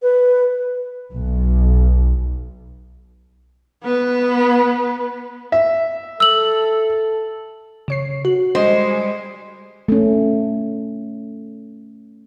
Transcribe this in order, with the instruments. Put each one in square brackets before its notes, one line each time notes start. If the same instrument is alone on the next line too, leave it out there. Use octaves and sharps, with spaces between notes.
[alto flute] B4
[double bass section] B1
[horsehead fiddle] B3 B4
[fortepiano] E5
[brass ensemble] A4 [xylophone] E6 F#7
[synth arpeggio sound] C#3 C#5 C7
F#4
[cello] G3 G#3 [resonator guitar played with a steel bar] C5 [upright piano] D#5
[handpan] A3 C#4